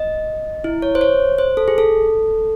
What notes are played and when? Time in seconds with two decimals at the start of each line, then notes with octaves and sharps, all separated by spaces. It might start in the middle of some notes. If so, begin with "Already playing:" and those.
Already playing: D#5
0.64 E4
0.82 C#5
0.95 C5
1.01 C#5
1.38 C5
1.57 A4
1.68 G#4
1.78 A4